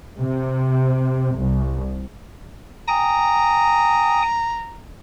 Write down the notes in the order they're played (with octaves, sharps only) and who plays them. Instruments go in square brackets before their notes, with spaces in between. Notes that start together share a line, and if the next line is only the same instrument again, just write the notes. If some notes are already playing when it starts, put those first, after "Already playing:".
[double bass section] C3
C2
[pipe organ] G5 G#5 D#6 [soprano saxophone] A#5